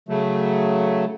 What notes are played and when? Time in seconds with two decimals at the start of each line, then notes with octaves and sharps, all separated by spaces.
0.09 C#3 F#3 A3